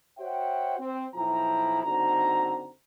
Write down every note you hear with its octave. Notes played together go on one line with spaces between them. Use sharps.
F#4 C5 C#5 E5 F#5 G5
C4
B1 F3 E4 G5 A#5
F#1 D3 C4 D#4 F#4 A#5